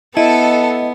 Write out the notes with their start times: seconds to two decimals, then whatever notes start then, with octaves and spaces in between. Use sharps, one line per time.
0.17 B3 E4 A4 D#5